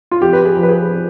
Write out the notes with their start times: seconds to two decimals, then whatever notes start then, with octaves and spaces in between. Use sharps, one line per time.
0.11 F4
0.21 F2 G4
0.33 B4
0.45 G#4
0.57 F3
0.63 B4
0.69 G#4